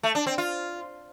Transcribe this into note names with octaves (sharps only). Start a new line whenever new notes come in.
A3
D4
C4
F4